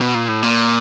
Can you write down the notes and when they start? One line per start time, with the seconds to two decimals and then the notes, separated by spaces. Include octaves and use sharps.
0.01 B2
0.15 A#2
0.28 A2
0.43 A#2